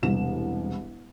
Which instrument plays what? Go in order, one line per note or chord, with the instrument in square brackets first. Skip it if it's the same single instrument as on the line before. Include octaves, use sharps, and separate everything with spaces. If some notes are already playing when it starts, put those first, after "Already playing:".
[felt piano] E1 C2 E7